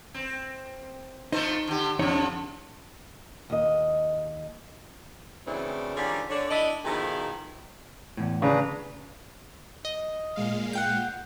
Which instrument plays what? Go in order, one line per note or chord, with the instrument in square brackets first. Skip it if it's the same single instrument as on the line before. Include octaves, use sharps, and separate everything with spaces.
[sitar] C4
[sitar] F3 A3 C5 [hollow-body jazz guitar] D#4
[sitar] D3 G4
[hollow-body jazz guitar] F2 D#4 C#5 [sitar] C#3 F3
[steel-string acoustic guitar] D#2 D#5
[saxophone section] A2 C#3 E3 F#3 C4 D4
D3 D#3 F3 G3 C#4 G#4
D3 D4 C#5
D4 E4 D#5
B2 D#3 F3 E4 G#4 A4
[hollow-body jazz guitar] E2 A2
[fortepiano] C#3 [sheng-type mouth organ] D4 B4 A#5
[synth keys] D#5
[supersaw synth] A#2 G#3 F5
[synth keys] F#5 G5 G6